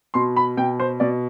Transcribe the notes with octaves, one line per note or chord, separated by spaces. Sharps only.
B2 C6
B5
B2 G5
C5
B2 D5